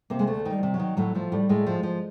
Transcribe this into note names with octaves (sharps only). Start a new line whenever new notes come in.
C3 A#3
G#3
D2 A3
D#3 G3
C3
F#3
D#3
A2 F#3
A2 F3
A2 G3
A2 G#3
F3 G#3
F3